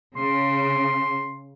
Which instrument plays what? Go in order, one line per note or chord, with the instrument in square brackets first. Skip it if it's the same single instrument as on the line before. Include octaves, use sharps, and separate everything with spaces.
[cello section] C#3 [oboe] C6